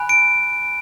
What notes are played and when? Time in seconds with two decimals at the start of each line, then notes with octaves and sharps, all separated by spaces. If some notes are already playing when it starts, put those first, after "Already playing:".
Already playing: G#5 B5 F#6
0.09 D7